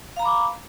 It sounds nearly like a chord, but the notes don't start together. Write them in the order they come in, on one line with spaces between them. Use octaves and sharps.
F5 A#5 B5 D6